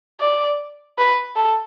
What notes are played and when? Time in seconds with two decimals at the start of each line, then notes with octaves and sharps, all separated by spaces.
0.21 D5
0.98 B4
1.36 A4